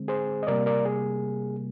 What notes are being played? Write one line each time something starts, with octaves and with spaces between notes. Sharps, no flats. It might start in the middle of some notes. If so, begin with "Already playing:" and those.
Already playing: D3 G#3 C4
G#4 C5
D#5
C3 G3 A#3 A#4 D5
A#4 D5
G#4